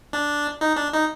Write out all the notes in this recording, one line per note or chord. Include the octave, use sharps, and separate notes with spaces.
D4
D#4
D4
D#4